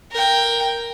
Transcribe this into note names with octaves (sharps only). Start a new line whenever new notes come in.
A#4 G5